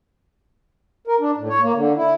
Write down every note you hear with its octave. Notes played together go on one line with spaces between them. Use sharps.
A#4
D4
A2
C#5
A#3
D3
E4